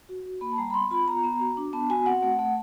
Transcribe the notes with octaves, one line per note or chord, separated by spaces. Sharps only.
F#4
F#4
A#3 B5
A5
G3 A#5
B5
B3 C6
F4 B5
B3 A#5
B3
F#4
D4
B3 A5
F#4 G#5
C4 F#5
A3
A3